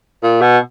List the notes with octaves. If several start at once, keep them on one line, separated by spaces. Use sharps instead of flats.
A#2
B2